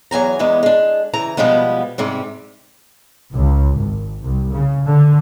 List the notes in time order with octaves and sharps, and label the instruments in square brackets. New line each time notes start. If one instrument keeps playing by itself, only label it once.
[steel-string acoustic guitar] E2 F#3 G#5 A#5
E2 G#3 B3
G#3 D4
C#3 E3 A#5
B2 F3 G3 G#3 B3
G#2 C3 G3
[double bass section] C#2
G#1
C2
C#3
D3